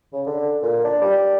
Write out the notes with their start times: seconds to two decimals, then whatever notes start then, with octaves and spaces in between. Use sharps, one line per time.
0.13 C#3
0.26 D3
0.63 A#2
0.84 D4
1.02 G3